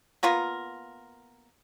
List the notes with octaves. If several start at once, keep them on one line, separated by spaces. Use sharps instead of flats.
A#3 B3 F4 A#4